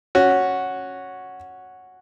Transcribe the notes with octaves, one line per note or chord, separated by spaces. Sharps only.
C#4 F#4